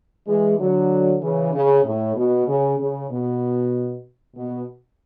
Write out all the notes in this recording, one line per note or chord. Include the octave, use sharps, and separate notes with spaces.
E3 G#3
D3 F#3
C#3 E3
C#3
A2
B2
C#3
C#3
B2
B2